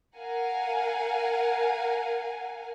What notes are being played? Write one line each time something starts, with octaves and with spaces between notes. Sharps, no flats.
A#4 F5 F#5 G#5